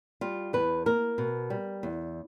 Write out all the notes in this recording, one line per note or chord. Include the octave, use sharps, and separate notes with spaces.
G3 F4
E2 B4
A#3 A#4
B2
G3
E2